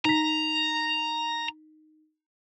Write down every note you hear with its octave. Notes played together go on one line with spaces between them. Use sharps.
D#4 A#5 B6